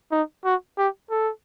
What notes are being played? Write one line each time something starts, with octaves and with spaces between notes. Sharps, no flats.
D#4
F#4
G4
A4